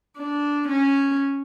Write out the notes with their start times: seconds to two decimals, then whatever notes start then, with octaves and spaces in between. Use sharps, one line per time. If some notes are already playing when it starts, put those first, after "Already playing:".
0.17 D4
0.69 C#4